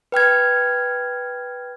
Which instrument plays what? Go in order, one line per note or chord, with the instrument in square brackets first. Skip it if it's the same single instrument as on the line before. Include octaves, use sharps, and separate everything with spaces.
[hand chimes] B4 G5 F6 G#6